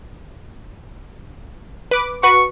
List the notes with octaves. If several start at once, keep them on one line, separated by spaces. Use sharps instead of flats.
B4 D6
F#4 B4 C#6